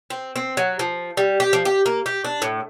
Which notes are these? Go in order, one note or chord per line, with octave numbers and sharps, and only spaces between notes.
C4
C4
F#3
F3
G3
G4
F3
G4
A#3
G4
D4
A2